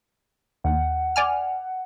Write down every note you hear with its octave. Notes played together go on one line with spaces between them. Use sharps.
D#2 F#5
D5 G#5 F6